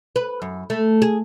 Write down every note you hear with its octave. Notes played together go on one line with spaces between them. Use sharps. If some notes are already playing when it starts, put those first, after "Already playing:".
B4
F#2
A3
G#4